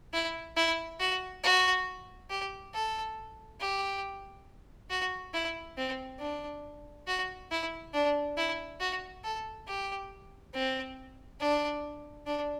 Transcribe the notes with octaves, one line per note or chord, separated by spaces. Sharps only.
E4
E4
F#4
F#4
G4
A4
G4
F#4
E4
C4
D4
F#4
E4
D4
E4
F#4
A4
G4
C4
D4
D4